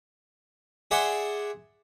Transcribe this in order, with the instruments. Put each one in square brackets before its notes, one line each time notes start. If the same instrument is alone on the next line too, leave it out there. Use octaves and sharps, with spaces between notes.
[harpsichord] G#4 D5 E5 F#5 C6